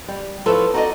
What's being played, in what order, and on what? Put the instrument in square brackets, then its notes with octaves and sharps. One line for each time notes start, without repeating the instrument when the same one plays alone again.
[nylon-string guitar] G3
F3 E4 F4 A4 B4 C#5
D#4 F#4 A4 C5 D5 D#5